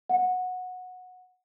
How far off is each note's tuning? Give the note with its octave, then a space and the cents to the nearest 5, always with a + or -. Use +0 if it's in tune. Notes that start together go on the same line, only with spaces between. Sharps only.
F#5 -15